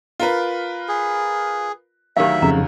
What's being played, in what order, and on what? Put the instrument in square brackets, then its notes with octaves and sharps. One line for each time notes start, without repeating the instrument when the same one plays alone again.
[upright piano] F4 A#4 B4
[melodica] G#4
[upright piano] D2 D#3 F#3 [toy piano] G4 F5 [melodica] E5
[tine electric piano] F2 C#3 [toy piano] A#5